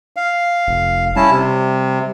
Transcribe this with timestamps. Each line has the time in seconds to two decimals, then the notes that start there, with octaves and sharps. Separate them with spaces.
0.16 F5
0.68 F1
1.16 G3 C#4 E4 A5
1.31 C3